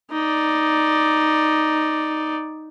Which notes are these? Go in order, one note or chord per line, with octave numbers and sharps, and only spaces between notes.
D#4 D5